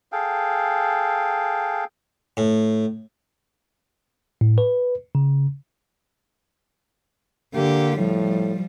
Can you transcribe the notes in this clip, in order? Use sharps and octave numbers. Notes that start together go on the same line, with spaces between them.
G#4 A4 F5 G5
A2
A2
B4
C#3
D3 A#3 G4
A2 F3 G3